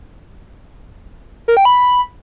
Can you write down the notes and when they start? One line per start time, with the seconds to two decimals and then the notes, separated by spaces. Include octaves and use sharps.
1.48 A#4
1.57 G5
1.65 B5